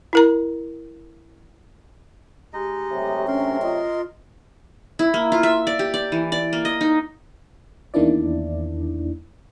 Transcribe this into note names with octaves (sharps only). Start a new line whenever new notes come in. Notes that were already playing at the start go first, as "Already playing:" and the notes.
E4 A#4 A#5
G#3 D#4 G4 D#5
C3 F#3 A3
C#4 D4 A#4 C6
F4 D#5
E4
A#3
F4
E5
D5
G4
D5
E3
D5
A#3
D#5
D#4
E2 D#3 A#3 D4 E4 D5